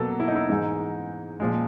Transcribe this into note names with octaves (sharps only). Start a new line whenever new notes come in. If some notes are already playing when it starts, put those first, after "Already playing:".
Already playing: B2 F#3 A#3 A4
E4
D#4
E4
G#2 E3 G#3 D#4
A#2 F3 G#3